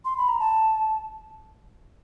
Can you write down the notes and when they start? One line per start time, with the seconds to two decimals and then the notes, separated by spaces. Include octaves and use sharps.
0.05 C6
0.17 B5
0.28 A#5
0.40 A5